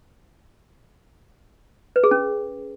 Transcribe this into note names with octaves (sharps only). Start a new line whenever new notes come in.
B4
G#4
C#4